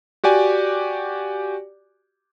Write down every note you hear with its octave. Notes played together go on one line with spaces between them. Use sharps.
F#4 G4 D5 G#5